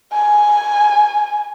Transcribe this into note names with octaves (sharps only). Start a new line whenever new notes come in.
G#5